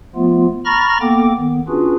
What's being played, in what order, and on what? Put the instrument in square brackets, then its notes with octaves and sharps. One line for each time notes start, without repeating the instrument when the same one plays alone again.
[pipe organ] F3 A3 B3 F4
A#5 B5 C#6 F6 A6 A#6
A#3 B3 A4 G5 D6
D#3 B3
C#4 D4 F4 F#4 G#4 B4